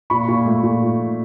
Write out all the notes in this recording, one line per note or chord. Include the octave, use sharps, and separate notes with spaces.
A#2 B5 C#6
A#2
A3
A#2